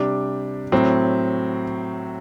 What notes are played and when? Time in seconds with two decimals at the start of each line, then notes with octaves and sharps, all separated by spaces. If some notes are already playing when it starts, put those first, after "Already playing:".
Already playing: C3 G3 D4
0.72 A2 F#3 C4